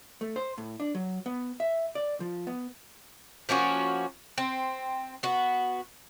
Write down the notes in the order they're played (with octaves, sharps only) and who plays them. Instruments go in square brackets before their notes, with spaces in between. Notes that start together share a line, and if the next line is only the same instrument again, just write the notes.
[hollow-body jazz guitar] A3
C5
A2
D4
F#3
B3
E5
D5
F3
B3
[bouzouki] F3 A#3 C#4 F#4
C4
B3 F#4